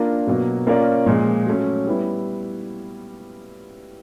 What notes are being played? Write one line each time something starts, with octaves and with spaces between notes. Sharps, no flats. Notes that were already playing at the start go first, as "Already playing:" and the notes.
Already playing: A#3 D4 F4 A#4
B2 F#3 A#3
A#3 C#4 F4 A#4 D5
A#2 F3 G#3
F#3 A3 C#4
G3 B3 E4